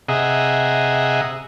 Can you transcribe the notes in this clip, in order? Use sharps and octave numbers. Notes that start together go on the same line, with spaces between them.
C3 G#4 D#5 E5 F#5 A#5